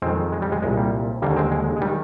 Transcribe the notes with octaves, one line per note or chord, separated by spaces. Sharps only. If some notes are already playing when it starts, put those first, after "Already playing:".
F2 D#3 G#3 C4
G#3
G3
G#3
C2 A#2 G#3
G3 A#3
D#2 D3 G3 A#3
G#3 C4
G#3
G#3
D#3 G3